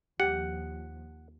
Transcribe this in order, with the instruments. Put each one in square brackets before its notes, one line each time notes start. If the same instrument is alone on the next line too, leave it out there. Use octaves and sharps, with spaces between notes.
[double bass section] D#2 F3 [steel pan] G4 [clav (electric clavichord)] F#5